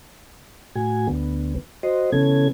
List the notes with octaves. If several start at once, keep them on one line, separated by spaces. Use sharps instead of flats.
A2 F#4 G#5
D2 D3 B3
F#4 C5 D#5
C#3 E3 B3 C#4 A4 G#6